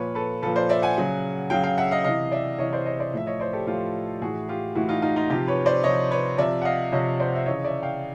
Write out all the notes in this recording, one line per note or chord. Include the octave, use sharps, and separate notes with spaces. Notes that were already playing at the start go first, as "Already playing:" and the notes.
Already playing: A#2 F3 B4 C#5
A4 B4
A#2 F3 A4 B4
C5 D5
D5 E5
F#5 G#5
C#3 F#3
C#3 F#3 F5 G5
F5 G5
E5 F#5
D#5 F5
C3 E3 D#5 F5
D5 E5
C3 E3 C#5 D#5
C5 D5
C#5 D#5
C5 D5
A2 F3 E5
C#5 D#5
C5 D5
G4 A4
A2 F3 F4 G4
A2 E3 F#4 G#4
F4 G4
A2 E3 E4 F#4
D#4 F4
F#4
D#4 F4
D#4 F4
C3 F3 F4 G4
B4 C#5
C5 D5
C3 F3 C#5 D#5
B4 C#5
C3 F3 D5 E5
F#5
D#5 F5
C3 F3 C#5 D#5
C5 D5
E5
C#3 E3 C#5 D#5
D5 E5
F5 G5